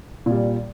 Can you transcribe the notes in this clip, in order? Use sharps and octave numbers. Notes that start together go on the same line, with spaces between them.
A#2 G3